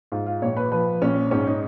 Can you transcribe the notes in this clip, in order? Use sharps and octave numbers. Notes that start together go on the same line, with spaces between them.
G#2 F4
F4
A#1 C#5
B4
F3 B4
A#1 C#4
G#2 C#4
D#4